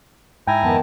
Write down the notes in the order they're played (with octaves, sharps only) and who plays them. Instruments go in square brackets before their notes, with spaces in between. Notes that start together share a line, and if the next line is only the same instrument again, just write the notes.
[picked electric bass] G#2 [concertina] E4 G#5 A#5 [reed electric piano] G5
[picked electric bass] F2 G#2 [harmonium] D#3 B3 A5